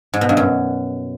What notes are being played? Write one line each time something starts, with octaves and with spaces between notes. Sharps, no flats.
G#2
B2
G2
F#2